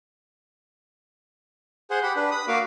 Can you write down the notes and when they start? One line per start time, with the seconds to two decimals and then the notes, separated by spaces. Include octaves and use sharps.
1.90 G#4 C5 F#5
2.03 G4 F#5 B5
2.16 D4 B4
2.31 B5 D#6
2.48 A#3 F#4 F5 D6